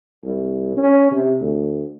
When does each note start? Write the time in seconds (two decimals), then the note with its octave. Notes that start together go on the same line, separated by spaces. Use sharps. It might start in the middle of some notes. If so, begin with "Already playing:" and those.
0.25 C2
0.77 C#4
1.12 C3
1.41 D2